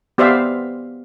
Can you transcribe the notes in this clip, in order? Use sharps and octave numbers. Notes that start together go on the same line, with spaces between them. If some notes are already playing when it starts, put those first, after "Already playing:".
B3 G4 C5 D5 E5 F5